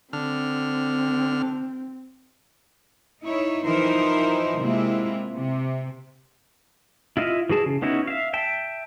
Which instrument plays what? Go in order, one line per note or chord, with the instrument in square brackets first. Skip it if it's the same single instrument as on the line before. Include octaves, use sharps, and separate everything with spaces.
[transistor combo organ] D3 F6 [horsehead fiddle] C4
[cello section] D#4 E4 C#5
E3 F3 D#4 E4 A#4 C5
C3 G#3 A#3 C4 E4 F4
C3
[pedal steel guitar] E4 F4 D#5 E5 F6
E3 F#4 G#4 A5
C#3
B3 C#4 D#4 E4 F#4
E5 F5
E5 G5 A5